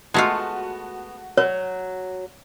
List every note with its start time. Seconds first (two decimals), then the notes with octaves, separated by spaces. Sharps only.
0.14 G#3 A3 B3 F4 F#4 A5
1.37 F#3 C#5